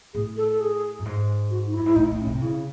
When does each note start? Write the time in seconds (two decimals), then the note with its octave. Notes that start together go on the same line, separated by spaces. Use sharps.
0.14 A2 G#4
0.37 A4
0.49 A4
0.60 G#4
0.99 F#2
1.05 G#2
1.50 F#4
1.67 D#4
1.74 E4
1.77 F#2
1.85 G#2 E4
1.96 A2 D#4
2.11 A2
2.19 C#4
2.27 C3
2.41 C#3 E4